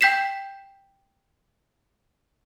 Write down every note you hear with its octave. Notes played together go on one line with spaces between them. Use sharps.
G5 G6 B6 C7 E7